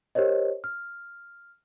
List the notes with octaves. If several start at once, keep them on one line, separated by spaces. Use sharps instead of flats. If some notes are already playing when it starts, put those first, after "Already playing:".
G4 A#4 C5 C#5 D#5
F6